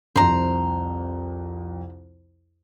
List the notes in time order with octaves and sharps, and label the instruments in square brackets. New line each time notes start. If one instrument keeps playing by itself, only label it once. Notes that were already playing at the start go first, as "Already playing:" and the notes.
[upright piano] C2 F2 [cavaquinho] C5 A#5